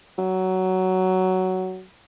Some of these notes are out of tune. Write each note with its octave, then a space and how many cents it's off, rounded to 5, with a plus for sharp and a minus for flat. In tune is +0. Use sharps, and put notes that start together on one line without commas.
F#3 +10